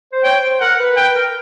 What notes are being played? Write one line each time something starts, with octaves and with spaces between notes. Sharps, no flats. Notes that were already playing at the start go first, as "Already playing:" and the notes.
C5
C#5 G5
C5
A#4 F#5
B4
B4 G5
A#4